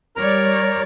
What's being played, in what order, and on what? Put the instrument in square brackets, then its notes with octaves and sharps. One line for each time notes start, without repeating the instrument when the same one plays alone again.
[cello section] G3 C#5 D5 [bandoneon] A#4 A#5